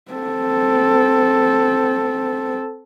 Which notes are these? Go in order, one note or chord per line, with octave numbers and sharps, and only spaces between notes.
C4 A4